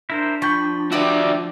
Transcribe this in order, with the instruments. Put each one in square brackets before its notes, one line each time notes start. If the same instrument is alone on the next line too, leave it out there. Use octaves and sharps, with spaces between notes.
[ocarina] D4 [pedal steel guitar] E4 A#4 C5
[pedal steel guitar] F3 G5 B5 [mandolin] C#6
[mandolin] B3 G4 E5 [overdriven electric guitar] F#4 D5